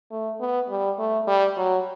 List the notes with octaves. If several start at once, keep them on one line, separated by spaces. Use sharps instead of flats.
A3
B3
G3
A3
G3
F#3